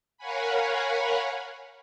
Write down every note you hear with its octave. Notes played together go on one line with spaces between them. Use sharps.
A#4 C#5 F5 F#5 G#5 B5